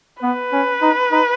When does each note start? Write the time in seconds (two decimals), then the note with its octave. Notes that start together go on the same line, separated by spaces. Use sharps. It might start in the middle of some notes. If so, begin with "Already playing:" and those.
0.22 B3 B4
0.52 C#4
0.82 D#4
1.12 D#4